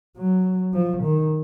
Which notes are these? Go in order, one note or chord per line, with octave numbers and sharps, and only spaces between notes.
F#3
F3
D#3